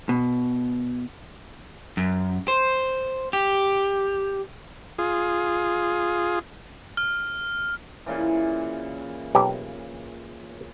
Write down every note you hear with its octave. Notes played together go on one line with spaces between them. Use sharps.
B2
F#2
C5
G4
F4 G#4
F6
A#2 C#3 E3
B1 G4